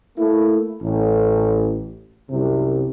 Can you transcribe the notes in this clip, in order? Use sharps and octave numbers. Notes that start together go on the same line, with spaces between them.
A3 A#3 E4
A1
C2 F#2 C3